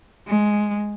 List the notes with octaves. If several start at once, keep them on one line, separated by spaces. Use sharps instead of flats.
G#3